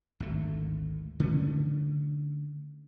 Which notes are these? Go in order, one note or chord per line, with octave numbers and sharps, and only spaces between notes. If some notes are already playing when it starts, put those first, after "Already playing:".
G#1 D2 A3
D3 A3 C#4